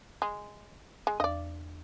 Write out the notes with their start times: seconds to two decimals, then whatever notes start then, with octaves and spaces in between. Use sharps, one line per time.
0.22 G#3
1.07 G#3
1.20 E2 D5 D#5